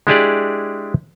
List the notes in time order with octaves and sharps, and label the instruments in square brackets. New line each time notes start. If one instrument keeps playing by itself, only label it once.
[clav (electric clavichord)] G#3 D4 E4 G4 G#4 D5